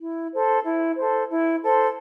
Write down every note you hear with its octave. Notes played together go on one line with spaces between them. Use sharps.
E4
A4 C5
E4
A4 C5
E4
A4 C5